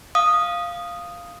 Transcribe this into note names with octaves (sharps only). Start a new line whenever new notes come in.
F5 D#6